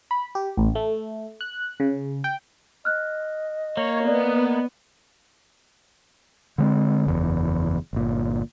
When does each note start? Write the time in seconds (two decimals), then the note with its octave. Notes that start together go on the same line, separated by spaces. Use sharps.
0.11 B5
0.35 G4
0.57 A1
0.75 A3
1.41 F#6
1.80 C#3
2.24 G5
2.85 D#5 F6 F#6
3.77 A#3 C#5
4.07 B3 D5
6.58 D3 G#3 C4
7.07 F#1 E2
7.93 G1 A#2